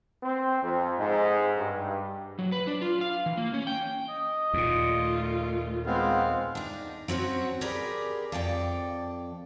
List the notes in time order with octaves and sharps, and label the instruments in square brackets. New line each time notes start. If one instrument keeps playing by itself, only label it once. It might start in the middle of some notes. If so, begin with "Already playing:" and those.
[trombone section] C4
F2
G#2
G2
[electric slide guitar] F#3
B4
D4
F4
F5
E3
A#3
C#4
G5
[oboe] D#5
[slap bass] D#2 A#2 [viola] A3 F4
[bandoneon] G#3 B3 C4 [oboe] F5
[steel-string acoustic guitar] D4 D#4
F#3 C4 C#4 F#4
G4 G#4 A#4 B4 D5
F2 A4 D5 G5